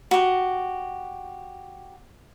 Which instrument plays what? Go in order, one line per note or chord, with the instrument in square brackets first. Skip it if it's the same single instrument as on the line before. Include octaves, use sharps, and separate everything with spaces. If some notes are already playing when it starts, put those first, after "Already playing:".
[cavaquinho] F#4 G4